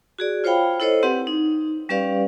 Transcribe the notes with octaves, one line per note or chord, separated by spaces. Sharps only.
F#4 G#4 D5
F4 C5 C#5 F5 G5 B5
E4 A4 C5 C#5 D#5
C4 G4 B4 F#5 C6
D#4
G3 C#4 G4 B4 D5 F5